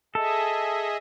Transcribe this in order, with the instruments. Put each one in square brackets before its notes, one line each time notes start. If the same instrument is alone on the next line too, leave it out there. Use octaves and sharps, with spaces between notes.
[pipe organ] G#4 D#5 E5 [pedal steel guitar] A4